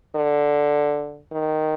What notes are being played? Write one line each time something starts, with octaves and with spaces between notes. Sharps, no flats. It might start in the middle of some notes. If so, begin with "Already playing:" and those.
D3
D#3